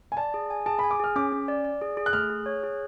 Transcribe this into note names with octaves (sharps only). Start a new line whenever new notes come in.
G#5
D5 A5
G#4
G#5
G#4 A5
G#5 B5
D6
G#4 F6
C#4 D6
C#4
D5
D5
G#4
G#4
F#6
A3 F6
G#4
C#5
G#4